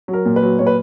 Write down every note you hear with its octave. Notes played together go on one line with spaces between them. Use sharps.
F#3
A#4
A#2
B4
F#3
A#2 C#5
B4